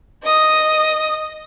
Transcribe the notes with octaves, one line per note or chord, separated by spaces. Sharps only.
D#5 D#6